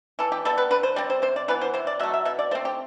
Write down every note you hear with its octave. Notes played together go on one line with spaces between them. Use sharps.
E3 A4
G4
G3 B3 A4
B4
D3 B4
C5
G3 C4 D5
C5
C3 C5
D5
E3 B3 B4
C5
C3 C5
D5
F#3 A3 E5
E5
B2 E5
D5
A3 C4 C5
G4